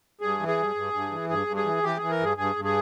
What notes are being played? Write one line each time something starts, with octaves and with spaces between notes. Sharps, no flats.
G2 G#4
E3
G#4
G2
G2
G2
E3
G2 G#4
G2
G#4
E3
E3 G4
E3 G#4
A#4
G2 G#4
G2 G#4
G2
G#4